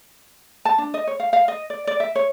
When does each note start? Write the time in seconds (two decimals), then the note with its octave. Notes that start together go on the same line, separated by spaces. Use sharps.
0.65 A5
0.78 D4
0.94 D#5
1.07 C#5
1.20 F5
1.33 F5
1.48 D#5
1.70 D5
1.87 D5
2.00 E5
2.15 C#5